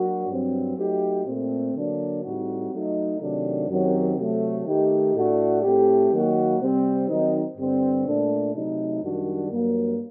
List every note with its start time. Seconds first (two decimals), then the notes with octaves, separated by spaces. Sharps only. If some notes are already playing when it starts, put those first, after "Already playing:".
Already playing: F#3 A#3 D4 F#4
0.28 G2 F#3 C4
0.77 F#3 A3 D#4 G4
1.25 A#2 A3 C4
1.73 D3 F#3 A#3 D4
2.23 A2 G3 C4 D#4 F#4
2.71 F#3 A3 D#4
3.20 C3 D#3 F#3 A3 D4
3.68 F#2 D#3 F#3 C4 G4
4.17 C3 F#3 A3
4.65 D#3 A3 D#4 G4
5.14 A2 A3 D4 F#4
5.62 A2 A3 C4 G4
6.11 D#3 F#3 A#3 F#4
6.60 C3 G3 C4
7.08 D#3 F#3 C4 D#4
7.57 G2 D3 G3 C4
8.06 A#2 A3 D4
8.54 C3 F#3 A3 D#4
9.02 F#2 D#3 G3 D4 F#4
9.51 G2 F#3 A#3